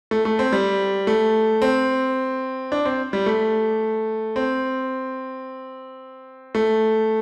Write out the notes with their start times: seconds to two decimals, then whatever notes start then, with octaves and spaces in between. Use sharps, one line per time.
0.11 A3
0.25 A3
0.39 C4
0.52 G3
1.07 A3
1.62 C4
2.72 D4
2.85 C4
3.13 G3
3.26 A3
4.36 C4
6.55 A3